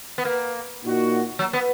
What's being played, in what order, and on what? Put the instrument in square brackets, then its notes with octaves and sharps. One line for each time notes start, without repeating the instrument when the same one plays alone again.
[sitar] B3
A#3
[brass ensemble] A#2 A#3 D#4 F#4
[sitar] F#3
B3